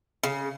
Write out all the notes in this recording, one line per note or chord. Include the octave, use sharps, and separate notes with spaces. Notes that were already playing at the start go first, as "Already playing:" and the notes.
C#3